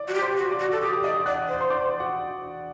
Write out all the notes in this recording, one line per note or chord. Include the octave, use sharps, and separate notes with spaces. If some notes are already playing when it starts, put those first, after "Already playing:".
Already playing: D5 D6
F#4
G4
C5 C6
F#4
D5 D6
F#4
A4
G4 D#6
D6
D5 D#5 D#6
D5 F#5 F#6
C5
C6
D5 D6
F#4 F#5